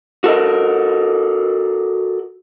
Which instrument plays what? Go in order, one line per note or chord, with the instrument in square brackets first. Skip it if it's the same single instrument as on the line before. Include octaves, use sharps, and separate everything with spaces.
[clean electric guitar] F#4 A4 A#4 D#5